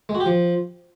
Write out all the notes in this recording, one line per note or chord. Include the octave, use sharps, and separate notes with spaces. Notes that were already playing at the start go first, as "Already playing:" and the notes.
G#3
F#4
G4
F3